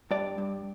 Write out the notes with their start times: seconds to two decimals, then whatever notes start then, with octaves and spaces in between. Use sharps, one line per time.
0.11 G2 D5
0.38 G2